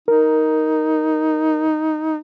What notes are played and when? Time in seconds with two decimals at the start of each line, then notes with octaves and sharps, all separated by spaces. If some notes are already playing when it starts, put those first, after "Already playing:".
0.08 D#4 A#4